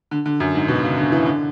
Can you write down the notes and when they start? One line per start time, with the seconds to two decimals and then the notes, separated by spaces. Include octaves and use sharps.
0.11 D3
0.26 D3
0.40 F#2
0.55 G#2
0.68 B2
0.83 C#3
0.97 D3
1.12 E3
1.26 D3